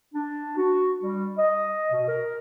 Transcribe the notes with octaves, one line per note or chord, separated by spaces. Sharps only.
D4
F#4
G3
D#5
B2
A#4